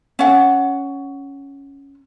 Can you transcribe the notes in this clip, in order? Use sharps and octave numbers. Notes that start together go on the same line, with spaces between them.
C#4 F#5